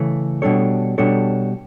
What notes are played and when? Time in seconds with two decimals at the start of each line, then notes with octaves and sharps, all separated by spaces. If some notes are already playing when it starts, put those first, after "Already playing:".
Already playing: C#3 E3 A3
0.42 B2 G3 D4 A4 C#5
0.98 B2 G3 D4 A4 C#5